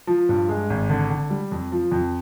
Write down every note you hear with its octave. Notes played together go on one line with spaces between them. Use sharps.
F3
G2
G#3
G#1
D3
D3
G3
F2
F3
F2